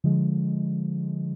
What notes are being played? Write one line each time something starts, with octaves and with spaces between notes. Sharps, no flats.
D3 F3 G#3